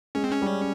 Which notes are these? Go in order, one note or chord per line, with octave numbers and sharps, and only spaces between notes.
G#3 C#4
C4
C#4
G3